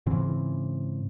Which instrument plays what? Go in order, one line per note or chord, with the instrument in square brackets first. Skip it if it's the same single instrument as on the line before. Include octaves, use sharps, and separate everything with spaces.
[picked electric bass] G#2 C#3 E3 C4